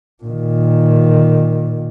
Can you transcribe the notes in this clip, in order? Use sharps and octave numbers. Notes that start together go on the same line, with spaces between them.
A#2 D#3